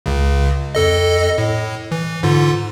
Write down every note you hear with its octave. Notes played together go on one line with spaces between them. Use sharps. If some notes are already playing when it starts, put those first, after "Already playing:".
C#2 C#3
F2 A4 D#5
A2
E3
G#2 D3 F4